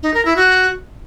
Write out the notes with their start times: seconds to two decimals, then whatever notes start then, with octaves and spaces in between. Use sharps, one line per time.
0.03 D#4
0.14 A#4
0.25 E4
0.37 F#4